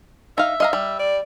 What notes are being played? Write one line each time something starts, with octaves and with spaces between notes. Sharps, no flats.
D#4 E5 F5
D#5 F5 A#5
G3
D5